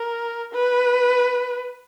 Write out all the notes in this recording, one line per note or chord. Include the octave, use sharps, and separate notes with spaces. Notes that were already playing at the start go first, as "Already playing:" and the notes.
Already playing: A#4
B4